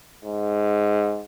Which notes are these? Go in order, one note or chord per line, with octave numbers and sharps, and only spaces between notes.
G#2